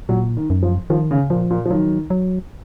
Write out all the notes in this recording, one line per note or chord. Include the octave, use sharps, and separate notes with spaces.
A#2 F#3
D#3
F#2
F3
D#3 F3
C#3
A#2 F3
A#2
F3
D#3 F#3
F#3